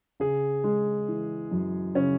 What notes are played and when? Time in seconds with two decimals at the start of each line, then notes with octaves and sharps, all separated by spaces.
0.20 C#3 G#4
0.64 G#3
1.08 E3
1.51 F#2
1.95 C#3 C#4